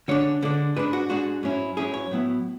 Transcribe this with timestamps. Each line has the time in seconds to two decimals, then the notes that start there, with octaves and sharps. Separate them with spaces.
0.08 D3 G#3 D4 C#5
0.42 D3 G#3 D4
0.76 G#2 G#3 D4 B4
0.93 F#4
1.09 G#2 G#3 D4 F#4
1.43 G#2 F#3 C#4 E4
1.77 G#2 F#3 C#4 E4 G#4
1.94 C#5
2.11 A2 F#3 B3 E4